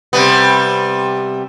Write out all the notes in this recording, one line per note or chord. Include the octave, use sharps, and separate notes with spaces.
C3 G3 B3